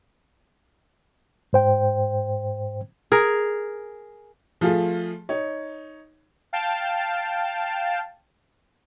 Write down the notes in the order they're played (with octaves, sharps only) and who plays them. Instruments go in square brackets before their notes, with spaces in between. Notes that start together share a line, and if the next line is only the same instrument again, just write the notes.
[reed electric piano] G#2 C5 G5
[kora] G#4 A#4
[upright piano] F3 A3 F4 G#4
D#4 C#5
[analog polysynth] F5 G5 A5